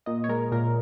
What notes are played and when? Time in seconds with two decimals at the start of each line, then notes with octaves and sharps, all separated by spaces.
0.06 A#2 D#5
0.24 C#5
0.29 G#3 A#4
0.52 A#2 A#4